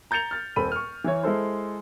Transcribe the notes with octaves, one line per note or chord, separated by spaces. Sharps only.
A#5 G6 A6 C#7 F7
F6 A6
D#1 C4 A4 B5 D#7
C#6 F6
E3 E4 C#5
G#3 E4 A4 C5